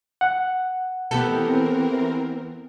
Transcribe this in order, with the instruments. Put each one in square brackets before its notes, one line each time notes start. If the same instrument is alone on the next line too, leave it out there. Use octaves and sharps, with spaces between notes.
[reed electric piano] F#5
[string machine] E3 C4 A#4 [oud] B3 G4 A4